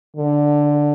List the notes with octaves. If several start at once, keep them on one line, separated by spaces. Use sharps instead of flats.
D3